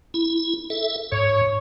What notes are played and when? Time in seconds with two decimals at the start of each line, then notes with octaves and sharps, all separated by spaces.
0.14 E4
0.70 A4 E5
1.12 G#2 C#5